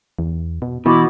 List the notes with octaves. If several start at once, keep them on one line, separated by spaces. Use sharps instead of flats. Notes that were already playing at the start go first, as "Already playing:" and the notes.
E2
B2
B2 E3 E4 B5 D6